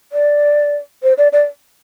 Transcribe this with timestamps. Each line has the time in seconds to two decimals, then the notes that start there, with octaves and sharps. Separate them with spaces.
0.12 D5
1.03 C5
1.18 D5
1.32 D5